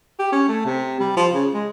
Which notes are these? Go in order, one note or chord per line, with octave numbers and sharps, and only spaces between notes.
G4
C#4
A3
C3
G3
F3
C#3
G#3